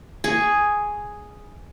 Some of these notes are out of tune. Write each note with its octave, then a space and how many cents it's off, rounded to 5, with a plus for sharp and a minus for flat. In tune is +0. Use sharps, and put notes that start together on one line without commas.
G#4 +0 C#6 +20